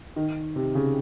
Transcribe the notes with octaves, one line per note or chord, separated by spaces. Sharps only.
D#3
C3
C#3